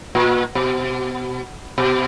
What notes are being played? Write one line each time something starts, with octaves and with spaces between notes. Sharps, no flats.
A#2
B2
B2